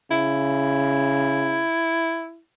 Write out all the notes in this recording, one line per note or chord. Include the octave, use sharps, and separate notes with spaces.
C#3 E4